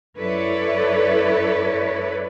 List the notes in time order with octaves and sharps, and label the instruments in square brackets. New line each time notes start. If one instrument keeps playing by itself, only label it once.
[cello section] F#2 E4 A4 B4 C#5 D5